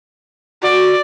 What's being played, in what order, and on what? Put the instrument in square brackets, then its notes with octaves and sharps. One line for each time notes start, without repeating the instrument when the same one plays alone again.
[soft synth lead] F#4 [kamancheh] D5